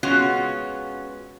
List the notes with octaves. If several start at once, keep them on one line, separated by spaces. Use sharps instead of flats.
G#3 B3 C#4 F4 F#4